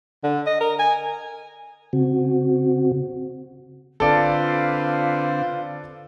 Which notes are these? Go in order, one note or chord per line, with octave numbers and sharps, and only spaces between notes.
D3
D#5
A#4
G#5
C#3 C4 F#4
D3 C4 F4 A4 B4 D5 F5